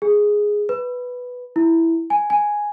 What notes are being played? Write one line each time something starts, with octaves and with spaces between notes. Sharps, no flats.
G#4
B4
E4
G#5
G#5